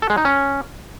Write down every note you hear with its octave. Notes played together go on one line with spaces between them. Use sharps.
A4
G#3
D#4
C#4